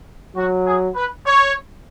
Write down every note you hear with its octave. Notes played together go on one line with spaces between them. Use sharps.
F#3 F#4
G#4
B4
C#5